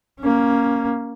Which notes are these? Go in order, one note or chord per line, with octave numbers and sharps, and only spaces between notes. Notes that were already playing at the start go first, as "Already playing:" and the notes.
A#3 C#4